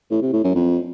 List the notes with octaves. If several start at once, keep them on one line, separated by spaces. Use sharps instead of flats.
A2
C3
A2
F#2
F2